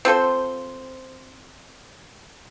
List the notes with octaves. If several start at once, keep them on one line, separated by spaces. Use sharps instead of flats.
C4 F4 A4 C5